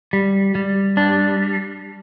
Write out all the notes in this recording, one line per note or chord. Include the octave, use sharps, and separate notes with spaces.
G3
G3
D4